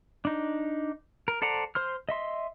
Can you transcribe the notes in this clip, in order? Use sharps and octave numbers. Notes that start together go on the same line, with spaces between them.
D4 D#4
A#4
A4 C5 D5 F#5 A#5
C5 C6 F6
D#5 E5 C6